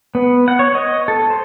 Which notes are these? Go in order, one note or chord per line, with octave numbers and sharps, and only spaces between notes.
B3
F#5
C#5
D#5
A4
C5